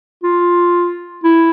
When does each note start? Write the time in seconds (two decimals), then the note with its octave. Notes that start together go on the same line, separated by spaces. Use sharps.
0.23 F4
1.24 E4